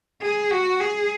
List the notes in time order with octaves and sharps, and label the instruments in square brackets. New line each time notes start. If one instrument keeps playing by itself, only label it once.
[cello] G#4
F#4
G#4